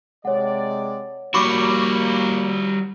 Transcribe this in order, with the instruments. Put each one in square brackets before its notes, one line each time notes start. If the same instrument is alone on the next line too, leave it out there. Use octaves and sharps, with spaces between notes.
[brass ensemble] C3 G#3 D5 [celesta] C#5 F#5
[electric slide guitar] G3 F#4 [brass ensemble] A#3 [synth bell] B5 C#6 D6